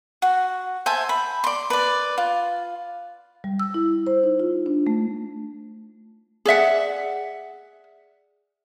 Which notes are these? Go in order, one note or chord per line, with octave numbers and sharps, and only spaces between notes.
F#4
C5 E5 G#5 A5
B5
D5 C6
B4 D5
F4
G3
E6
E4
C5
D#4
F4
D4
A3
G#4 D5 E5 F#5